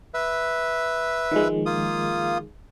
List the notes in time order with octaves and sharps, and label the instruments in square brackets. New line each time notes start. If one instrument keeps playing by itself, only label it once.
[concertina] B4 E5
[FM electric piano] D#3 F3 G#3
[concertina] A#3 F4 D#6